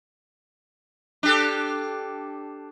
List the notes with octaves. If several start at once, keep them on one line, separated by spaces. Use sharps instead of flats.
D4 G4 A4